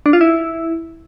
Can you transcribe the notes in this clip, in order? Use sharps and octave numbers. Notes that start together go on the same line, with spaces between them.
D4
F4
E4